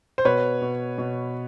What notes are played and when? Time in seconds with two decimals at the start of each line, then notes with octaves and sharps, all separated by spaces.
0.18 C5
0.25 B2 B4 C#5
0.62 B2
0.98 B2